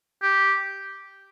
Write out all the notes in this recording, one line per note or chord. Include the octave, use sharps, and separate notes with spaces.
G4